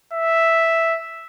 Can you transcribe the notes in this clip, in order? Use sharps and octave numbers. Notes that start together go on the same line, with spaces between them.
E5